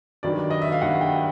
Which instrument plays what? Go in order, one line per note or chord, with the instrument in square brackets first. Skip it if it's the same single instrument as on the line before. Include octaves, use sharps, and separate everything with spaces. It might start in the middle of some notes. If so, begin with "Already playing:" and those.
[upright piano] G2 D#3 F#3 D5
D#5
E5
F5
G2 D#3 F#3 F#5
G5